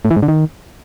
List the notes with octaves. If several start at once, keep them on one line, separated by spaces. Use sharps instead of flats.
A2
E3
G#2
D3
D#3